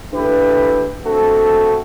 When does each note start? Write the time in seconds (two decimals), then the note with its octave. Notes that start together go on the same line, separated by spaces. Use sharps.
0.10 D3 A3 E4 G4 B4
1.05 D3 A3 C4 F#4 A4